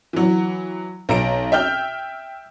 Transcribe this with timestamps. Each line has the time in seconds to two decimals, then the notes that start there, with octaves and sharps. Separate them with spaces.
0.13 E3 F#3
1.09 B1 A#5 D7
1.52 E5 G5 F6 G6